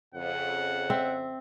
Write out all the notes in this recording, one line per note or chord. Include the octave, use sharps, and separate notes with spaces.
F2 C#3 F#5
C4 E5